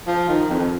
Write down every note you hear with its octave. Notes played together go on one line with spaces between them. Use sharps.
F3
D#3
F2